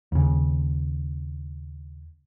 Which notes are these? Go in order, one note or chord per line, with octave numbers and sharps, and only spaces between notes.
D#2 C#3